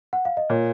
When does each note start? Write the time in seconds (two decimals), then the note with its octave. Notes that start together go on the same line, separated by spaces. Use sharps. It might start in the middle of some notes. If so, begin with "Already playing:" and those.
0.13 F#5
0.25 F5
0.37 D#5
0.50 A#2 C#5